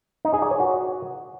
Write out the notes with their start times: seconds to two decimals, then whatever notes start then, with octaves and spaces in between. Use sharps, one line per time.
0.25 D#4
0.33 G#4
0.42 D5
0.51 C#5
0.60 F#4